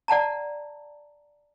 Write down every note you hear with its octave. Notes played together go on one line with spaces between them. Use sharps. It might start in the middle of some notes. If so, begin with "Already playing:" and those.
D5 F#5 A5 A#5